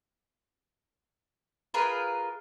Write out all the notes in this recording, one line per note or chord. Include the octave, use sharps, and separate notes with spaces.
F4 G#4 A#4 B4